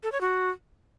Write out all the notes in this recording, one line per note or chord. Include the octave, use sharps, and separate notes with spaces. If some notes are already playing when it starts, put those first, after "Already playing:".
A4
C#5
F#4